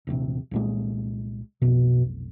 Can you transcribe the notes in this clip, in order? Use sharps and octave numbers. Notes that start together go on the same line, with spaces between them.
D#1 A#1 C3
C2 A#2 G#3
F1 B1 B2